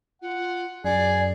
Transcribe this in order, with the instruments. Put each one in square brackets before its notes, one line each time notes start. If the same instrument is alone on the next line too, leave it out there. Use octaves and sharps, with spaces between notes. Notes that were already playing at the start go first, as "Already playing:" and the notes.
[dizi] F4 [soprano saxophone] F#5
[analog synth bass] F#2 [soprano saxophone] G#4 [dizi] D5